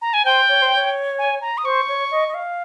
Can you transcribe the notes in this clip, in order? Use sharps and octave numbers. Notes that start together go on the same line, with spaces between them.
A#5
G#5
C5 G5
C#5
C5
C#5
G#5
A#5
D#6
C5 C#6
C#5
D#5
D#5
F5